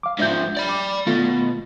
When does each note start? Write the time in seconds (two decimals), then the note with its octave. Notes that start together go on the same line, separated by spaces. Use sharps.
0.03 F5 D6
0.19 G#2 F3 D4 E5 G6
0.57 D5 B5
0.69 D6
1.07 B2 D#3 A3 F4